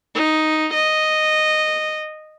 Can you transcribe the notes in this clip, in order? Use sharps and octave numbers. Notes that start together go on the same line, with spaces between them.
D#4
D#5